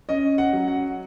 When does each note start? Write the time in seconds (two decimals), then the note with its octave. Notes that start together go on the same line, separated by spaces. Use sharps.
0.09 C#4 D#5
0.38 F#5
0.53 F#3
0.68 F#5